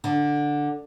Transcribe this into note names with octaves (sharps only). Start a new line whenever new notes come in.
D3